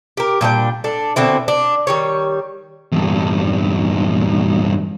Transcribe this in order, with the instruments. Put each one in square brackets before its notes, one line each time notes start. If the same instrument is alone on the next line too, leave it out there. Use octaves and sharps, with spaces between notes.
[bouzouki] G4 A#4
A#2 G3 D4 G5
D4 A4
B2 D3 C4 E4
D4
D#3 G3 C#5
[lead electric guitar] E2 G2